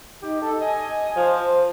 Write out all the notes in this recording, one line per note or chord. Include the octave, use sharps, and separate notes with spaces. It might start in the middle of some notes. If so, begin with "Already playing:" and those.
D#4 G4
A4
D#5 G#5
F3 C5